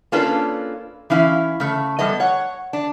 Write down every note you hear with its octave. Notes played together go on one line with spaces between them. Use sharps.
A#3 C#4 D4 F4 A4 B4
E3 C#4 E4 F5
C#3 A3
G3 A3 B3 D#5
C#5 F#5
D4